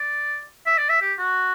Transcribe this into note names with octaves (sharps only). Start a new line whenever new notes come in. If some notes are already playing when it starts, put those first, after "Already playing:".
Already playing: D5
E5
D5
E5
G4
F#4